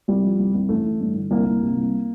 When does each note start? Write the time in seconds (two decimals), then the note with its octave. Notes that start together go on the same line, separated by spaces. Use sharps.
0.08 C2 G3
0.23 F3
0.39 C2
0.54 C2
0.69 A1 A3
0.84 A1
1.01 G2
1.16 D3
1.31 C2 A#3
1.46 C2
1.62 C3
1.77 C2